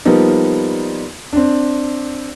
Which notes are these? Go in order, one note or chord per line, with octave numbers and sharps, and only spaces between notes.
F3 G3 A#3 B3 D#4
C4 D4